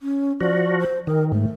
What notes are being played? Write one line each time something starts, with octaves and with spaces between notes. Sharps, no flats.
C#4
F3 F#4 D5
C5
D#3 A#4
G#2 A3